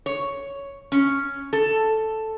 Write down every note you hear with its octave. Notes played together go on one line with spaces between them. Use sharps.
C#5
C#4
A4